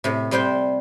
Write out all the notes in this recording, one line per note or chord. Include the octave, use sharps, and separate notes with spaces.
A2 C3
C3 G3 C4 C5 G5